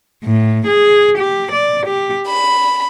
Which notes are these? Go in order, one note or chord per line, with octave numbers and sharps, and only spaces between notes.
A2
G#4
G4
D5
G4
B5